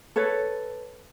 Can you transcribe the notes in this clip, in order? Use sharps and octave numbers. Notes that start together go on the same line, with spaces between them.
A4 B4 C#5